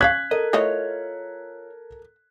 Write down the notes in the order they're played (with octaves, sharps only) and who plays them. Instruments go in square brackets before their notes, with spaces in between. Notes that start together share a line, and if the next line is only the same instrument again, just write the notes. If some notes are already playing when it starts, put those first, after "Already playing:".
[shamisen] C#4 C#5 F5 [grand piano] F#6 G#6 B6
[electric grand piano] A4 A#4 [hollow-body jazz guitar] D#5
[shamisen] A3 E4 D#5 [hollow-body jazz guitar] F4 C#5